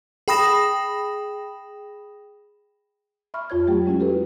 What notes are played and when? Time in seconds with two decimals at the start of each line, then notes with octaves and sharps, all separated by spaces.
0.28 G#4 G5 B5 D#6 A#6 E7
3.34 E5 B5 C#6 F6
3.50 F2 F4 C#5 G#6
3.67 F#3 A3 G4 G5
3.86 G#3 C#4 E4 F#4
4.00 G4 A4 B4